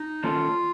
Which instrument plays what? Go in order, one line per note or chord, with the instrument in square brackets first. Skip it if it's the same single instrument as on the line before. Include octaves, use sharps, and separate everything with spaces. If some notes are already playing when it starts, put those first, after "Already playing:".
Already playing: [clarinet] D#4
[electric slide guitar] D#3 A#3 C#4 A4 [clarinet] F4